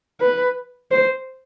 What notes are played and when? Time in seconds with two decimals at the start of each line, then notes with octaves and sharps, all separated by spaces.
0.20 B4
0.91 C5